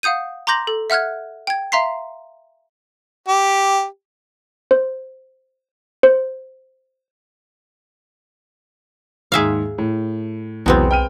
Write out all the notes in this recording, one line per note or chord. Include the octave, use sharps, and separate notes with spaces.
F5 F#5 D#6 G6 D#7
A#5 C6 D6 G6 A#6 F#7
A4
E5 F#5 F6 F#6 G#6
G5 G#6
E5 F5 A#5 C6 B6 C7
G4
C5
C5
D#2 G#2 G#4 E5 F5
A2
B1 E2 C3 F#3 G#3 B3 C4
G5 F6 D#7